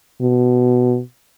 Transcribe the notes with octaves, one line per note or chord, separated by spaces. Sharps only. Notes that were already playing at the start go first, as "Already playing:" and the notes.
B2